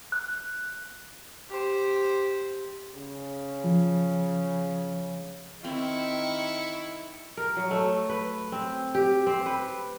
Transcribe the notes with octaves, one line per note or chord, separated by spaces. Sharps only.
F#6
G4 C5
C#3
F3
D#3 C4 E4 C#6
A#4
F#3
A3
B4
C4
G4
C4
B4